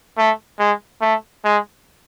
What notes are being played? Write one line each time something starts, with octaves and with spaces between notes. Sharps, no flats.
A3
G#3
A3
G#3